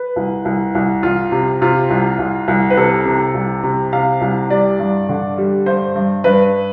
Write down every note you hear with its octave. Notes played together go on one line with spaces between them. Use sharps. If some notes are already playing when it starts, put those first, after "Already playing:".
Already playing: B4
C2
C2
C2
C2 F4
C3
C3 F4
C2
C2
C2
B4
C3 A4
C3
C2
C3
C3 F5
C2
G3 D5
G2
D3
G3
G2 C5
G2
G2 B4